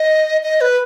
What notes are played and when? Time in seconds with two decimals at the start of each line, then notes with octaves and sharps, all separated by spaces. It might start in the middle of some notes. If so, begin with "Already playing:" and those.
Already playing: D#5
0.43 D#5
0.61 B4